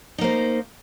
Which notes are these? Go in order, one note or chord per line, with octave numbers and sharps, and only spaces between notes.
A#3 D#4 C5